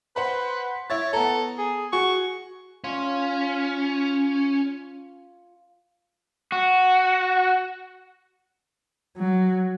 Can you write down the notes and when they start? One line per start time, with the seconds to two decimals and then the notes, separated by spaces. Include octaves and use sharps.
0.16 B4 C5 F#5 B5
0.90 E4 C#5 E5 A6
1.13 B3 A4 A#5
1.58 G#4
1.93 F#4 G#4 C#6
2.84 C#4 F4
6.52 F#4
9.17 F#3